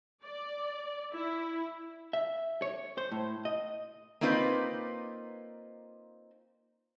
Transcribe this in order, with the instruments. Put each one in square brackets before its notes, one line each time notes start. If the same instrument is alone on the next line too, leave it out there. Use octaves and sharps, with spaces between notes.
[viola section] D5
E4
[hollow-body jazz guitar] E5
C#5
C5
A2
D#5
[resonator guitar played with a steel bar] A#3 C4 D#4 F4 B4 D5